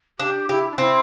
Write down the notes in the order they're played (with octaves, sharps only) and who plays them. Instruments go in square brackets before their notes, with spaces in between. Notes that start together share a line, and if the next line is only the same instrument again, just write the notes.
[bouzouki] D4 [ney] G4
[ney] E4 [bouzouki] G4
[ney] D4
[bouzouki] C4 [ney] E4